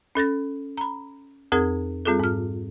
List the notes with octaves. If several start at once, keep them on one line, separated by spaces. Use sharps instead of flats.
C#4 A4 A6 A#6
A#5 B5
F2 C4 G#4 A#4 D#6 G#6
G3 C4 F4 G#4 A4
G#2 F6